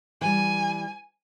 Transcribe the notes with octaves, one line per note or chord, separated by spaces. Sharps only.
E3 G3 G#5